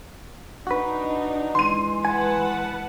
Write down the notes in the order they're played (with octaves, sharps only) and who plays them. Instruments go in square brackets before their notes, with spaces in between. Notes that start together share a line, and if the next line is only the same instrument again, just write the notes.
[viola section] D4 D#4 [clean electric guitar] F#4 B4
[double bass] E3 G#3 [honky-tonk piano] C6 D#7
[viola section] B4 F#5 A5 [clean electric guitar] G#5